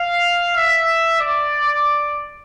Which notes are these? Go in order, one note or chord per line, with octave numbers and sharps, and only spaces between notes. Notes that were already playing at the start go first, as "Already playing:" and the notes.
Already playing: F5
E5
D5